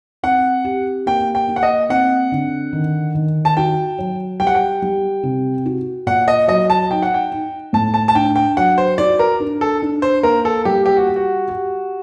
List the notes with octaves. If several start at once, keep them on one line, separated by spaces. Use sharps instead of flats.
C4 F#5
G4
A#3 G5
G5
A#3
F#5
D#5
C4 F#5
D3
D#3
D#3
A5
F#4 G5
F#3
G3 G5
F#5
G5
G3
C3
F#4
A#2 F#5
D#5
F#3 D#5
A5
D#4 G5
F#5
G5
D#4
A2 A5
A5
A5
D4 G5
G5
F#3 F#5
C5
F#4 D5
A#4
D4
A4
D4
C5
A#3 A#4
A4
G3 G4
G4
F#4
G4
F#4
G4